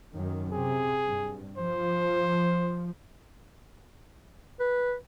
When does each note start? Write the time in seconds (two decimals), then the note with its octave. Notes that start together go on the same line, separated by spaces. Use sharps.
0.14 F#2 D#3
0.52 C3 G#4
1.06 G2
1.57 F3 C5
4.60 B4